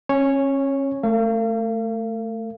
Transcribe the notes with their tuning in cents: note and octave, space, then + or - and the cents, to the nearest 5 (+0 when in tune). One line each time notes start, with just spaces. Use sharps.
C#4 -35 C#5 -5 G#5 +0
A3 +0 A#4 -45 F5 -35